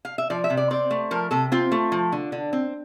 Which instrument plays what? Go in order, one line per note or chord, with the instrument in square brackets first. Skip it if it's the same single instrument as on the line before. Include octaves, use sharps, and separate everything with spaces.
[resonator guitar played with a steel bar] F5
E5
F3 D5
E5
C3
D5
C4 D5
A3
F3 A#4
C3 A4
C4 F4
A3
F3
D3
D3
C4